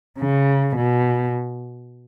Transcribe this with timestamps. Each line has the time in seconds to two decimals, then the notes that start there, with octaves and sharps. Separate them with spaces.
0.19 C#3
0.76 B2